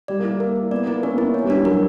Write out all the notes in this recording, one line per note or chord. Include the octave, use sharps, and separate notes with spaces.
G3 D5
A#3
E4
A#3
A#4
E4
B3 D5
A#3 E4
C#4 A#4
B3
E4
C#4
B3 C#5
G3
D4
G3
F#3 A#4